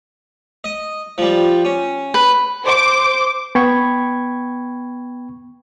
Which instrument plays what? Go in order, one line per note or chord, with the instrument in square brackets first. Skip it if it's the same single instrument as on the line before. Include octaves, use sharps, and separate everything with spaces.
[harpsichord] D#5
F3 G3
C#4
[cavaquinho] B4
[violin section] C5 D6
[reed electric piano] B3 G5 B5 C#6 G#6